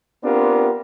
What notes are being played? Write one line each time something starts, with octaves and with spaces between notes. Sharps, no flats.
B3 C4 D4 F4 G4 A#4